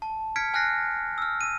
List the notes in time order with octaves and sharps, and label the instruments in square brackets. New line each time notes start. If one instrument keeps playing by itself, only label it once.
[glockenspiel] A5
F6 G#6 B6 C#7 D7
G#5 F6 F#6 A#6 C7
E6 F6
E6 D#7